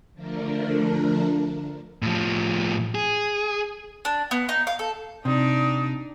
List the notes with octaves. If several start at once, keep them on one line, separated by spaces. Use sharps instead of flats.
D3 F3 A3 D4 A#4
A2 F3
G#4
D4
B3
D#4
F5
A4
C3 D4 D#4 D5 D#6